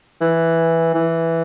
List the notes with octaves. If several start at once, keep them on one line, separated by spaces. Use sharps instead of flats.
E3
E3